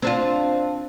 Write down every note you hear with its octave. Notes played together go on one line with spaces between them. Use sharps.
C4 D4 F4